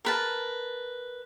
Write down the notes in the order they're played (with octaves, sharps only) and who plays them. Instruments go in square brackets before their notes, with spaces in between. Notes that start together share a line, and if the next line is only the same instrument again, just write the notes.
[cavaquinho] A#4 B4 A5